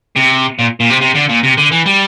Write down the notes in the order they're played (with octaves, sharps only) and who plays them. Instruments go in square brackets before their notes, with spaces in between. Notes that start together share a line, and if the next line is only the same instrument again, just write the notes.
[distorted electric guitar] C3
A#2
A#2
C3
C3
D3
A#2
C3
D3
E3
G3